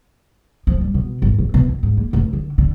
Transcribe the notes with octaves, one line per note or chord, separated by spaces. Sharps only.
F3
G3
B2
G1
A#1
B2
D#2
G#2
A#3
F1
D3
D3